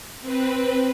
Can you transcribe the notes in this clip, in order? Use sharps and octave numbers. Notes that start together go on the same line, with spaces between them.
C4 B4